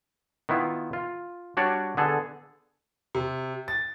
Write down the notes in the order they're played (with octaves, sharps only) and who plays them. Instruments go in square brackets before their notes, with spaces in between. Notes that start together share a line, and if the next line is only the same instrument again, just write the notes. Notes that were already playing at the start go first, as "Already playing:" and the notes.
[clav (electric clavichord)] D#3 B3 E4 F4
F4
G3 D4 F#4 C#5 D5
D3 B3 G#4 A4
[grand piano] C3
A6